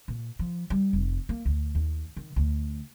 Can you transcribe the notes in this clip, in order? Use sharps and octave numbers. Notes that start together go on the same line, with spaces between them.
A#2
F3
G3
F1
A#3
D2
D#2
D#3
D2